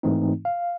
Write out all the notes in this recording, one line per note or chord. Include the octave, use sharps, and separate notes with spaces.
G#2 E3 A3 C4 D#4
F5